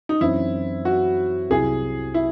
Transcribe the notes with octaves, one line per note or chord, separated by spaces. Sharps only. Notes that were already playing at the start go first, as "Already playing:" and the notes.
D#4
F#2 E3 C4 E4
F#4
C2 C3 F#3 C4 E4 G#4
E4